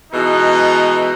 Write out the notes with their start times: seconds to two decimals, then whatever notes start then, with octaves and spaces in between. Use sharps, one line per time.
0.13 B2 E3 G#3 D#4